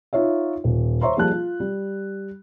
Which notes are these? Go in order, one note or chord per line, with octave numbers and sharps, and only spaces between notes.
D#4 F4 C#5 E5
D#1
C5 C#5 E5 A#5 C6 C#6
F3 G3 A#3 G#4 A5 F#6
F4
G3